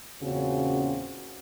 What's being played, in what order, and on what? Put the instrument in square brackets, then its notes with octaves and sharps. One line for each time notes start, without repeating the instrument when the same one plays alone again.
[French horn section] E2 A#2 C#3 C4 C#4 F#4